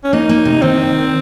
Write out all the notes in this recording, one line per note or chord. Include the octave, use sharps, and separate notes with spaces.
C#4
A#3 D#4
A#3
C3
D#3 C4